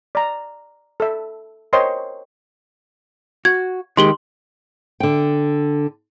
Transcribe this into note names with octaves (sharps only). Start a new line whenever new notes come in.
D5 A#5
A4 E5
A#4 C5 C#5 D#5 G5 C6
F#4 G#6
D#3 G#3 G4 C6 F#7 G7
D3 G5